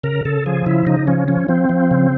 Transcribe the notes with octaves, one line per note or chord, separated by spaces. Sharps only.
C#3 A#4
C#3 A4
F3 G#4
C#3 E4
C#3 D#4
F3 C#4
F3 C#4
F3 C4
F3
C#3